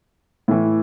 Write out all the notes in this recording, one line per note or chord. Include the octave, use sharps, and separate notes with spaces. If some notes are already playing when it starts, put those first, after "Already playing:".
A2 E3